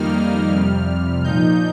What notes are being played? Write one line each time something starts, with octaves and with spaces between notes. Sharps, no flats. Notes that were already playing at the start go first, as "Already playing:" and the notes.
Already playing: F2 D#3 G3 A#3 D#4 F6
F2 C3 G3
A#2 F3 D#4 G6